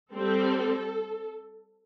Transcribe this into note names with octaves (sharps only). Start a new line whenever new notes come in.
G3 C4 A4